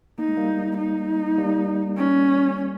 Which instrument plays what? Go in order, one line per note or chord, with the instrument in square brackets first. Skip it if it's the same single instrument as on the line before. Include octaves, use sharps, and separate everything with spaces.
[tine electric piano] A#3 [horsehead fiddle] D#4
[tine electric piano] G#3
G3 A#3
[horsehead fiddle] D#4
[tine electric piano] G3 A#3
[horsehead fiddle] C#4